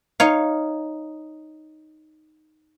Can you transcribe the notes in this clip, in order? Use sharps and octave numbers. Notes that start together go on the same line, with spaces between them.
D#4 C#5 F5